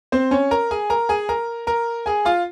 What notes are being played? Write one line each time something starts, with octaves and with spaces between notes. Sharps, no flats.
C4 C5
C#4 C#5
A#4 A#5
G#4 G#5
A#4 A#5
G#4 G#5
A#4 A#5
A#4 A#5
G#4 G#5
F4 F5